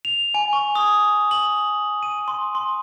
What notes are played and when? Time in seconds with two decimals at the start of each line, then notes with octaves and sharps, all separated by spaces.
0.05 F7
0.34 G#5
0.53 C#6
0.75 D#6
1.31 F#7
2.03 D#7
2.28 C6
2.55 C6